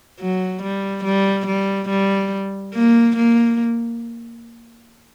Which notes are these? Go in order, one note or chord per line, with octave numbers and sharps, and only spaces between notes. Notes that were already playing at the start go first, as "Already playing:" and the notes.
F#3
G3
G3
G3
G3
A#3
A#3